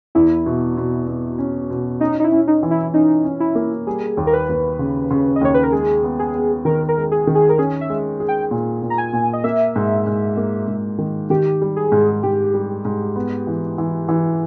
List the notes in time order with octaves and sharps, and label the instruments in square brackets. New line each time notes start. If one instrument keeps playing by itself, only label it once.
[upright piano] E2 [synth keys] E4
[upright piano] B2
B2
B2
C#4
B2
[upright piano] C#4 [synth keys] D#4
[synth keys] D#4
E4
[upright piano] C#4
[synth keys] D#4
[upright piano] E3
[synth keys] E4
[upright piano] C#4 [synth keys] D#4
[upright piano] C#4
[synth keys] E4
[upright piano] A#3
[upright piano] G3 [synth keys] G#4
[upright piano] D#2
[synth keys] A#4
B4
[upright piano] D#2
C#3
C#3
[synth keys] D#5
[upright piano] D#2 [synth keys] C#5
[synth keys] B4
A#4
[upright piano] G#3 [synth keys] G#4
[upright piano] B3
[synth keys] G#4
[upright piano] B3
[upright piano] D#3 [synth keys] A#4
[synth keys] A#4
[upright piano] G#3
[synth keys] G#4
[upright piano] D#3
[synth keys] G#4
A#4
[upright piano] C#4 [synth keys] G#4
[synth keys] E5
[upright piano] G#3
G#4
[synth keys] G5
[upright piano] A#2
A#2
[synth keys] A#5
G#5
[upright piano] A#2
[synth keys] D#5
[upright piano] A#3 [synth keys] E5
[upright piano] G#2
G#2
A#3
G#2
D#3
[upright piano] D#3 [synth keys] G4
[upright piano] G3
[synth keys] G#4
[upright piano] G#2
[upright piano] G#2 [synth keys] G4
[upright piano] G3
G#2
B3
E3
E3
E3